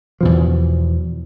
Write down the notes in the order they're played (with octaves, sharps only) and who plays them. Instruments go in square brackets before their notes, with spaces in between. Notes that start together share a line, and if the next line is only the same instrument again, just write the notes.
[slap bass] E2 B2 F3